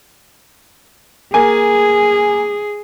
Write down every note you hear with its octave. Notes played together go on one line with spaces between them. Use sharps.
A#3 G#4 G#5